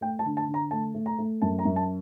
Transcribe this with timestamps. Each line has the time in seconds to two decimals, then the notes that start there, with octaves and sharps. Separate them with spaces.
0.01 A3 G5
0.19 A5
0.25 D3
0.37 A5
0.48 D3
0.54 A#5
0.71 A3 A5
0.94 A3
1.06 A#5
1.18 A3
1.42 F#2 A5
1.59 A#5
1.65 F#2
1.76 A5